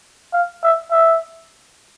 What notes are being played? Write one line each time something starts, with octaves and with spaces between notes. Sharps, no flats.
F5
E5
E5